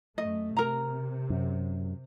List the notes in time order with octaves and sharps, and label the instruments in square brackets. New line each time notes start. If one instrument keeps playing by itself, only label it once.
[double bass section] F#2 A3 [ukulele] D#5
[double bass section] C3 [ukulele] A#4 A#5
[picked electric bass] F#2